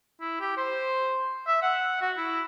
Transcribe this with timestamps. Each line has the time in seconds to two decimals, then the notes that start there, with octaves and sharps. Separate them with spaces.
0.21 E4
0.40 G4
0.57 C5
1.47 E5
1.63 F#5
2.02 F#4
2.17 E4